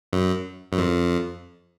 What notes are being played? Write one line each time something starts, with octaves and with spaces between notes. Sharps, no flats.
F#2
F#2
F2